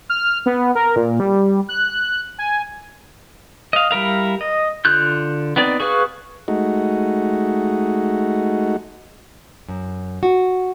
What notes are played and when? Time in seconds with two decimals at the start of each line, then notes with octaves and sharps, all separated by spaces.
0.10 F6
0.46 B3
0.75 A#4
0.96 A#2
1.20 G3
1.69 F#6
2.38 G#5
3.73 D#5 F5
3.91 G3 E4 A#4 F5
4.41 D#5
4.85 D3 F4 F#6 G6
5.56 B3 C4 D#4 D5
5.80 F#4 G#4 B4 F5 C#6
6.48 G#3 A3 D#4 F#4
9.68 F#2
10.23 F#4